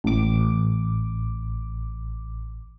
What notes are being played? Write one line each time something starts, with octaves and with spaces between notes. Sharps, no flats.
A1 D6